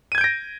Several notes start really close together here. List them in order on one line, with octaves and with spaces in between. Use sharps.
D#7 G#6 G6 D7 A#6